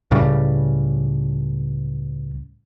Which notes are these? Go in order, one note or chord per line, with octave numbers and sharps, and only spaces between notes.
C#2 A2 C#3 G3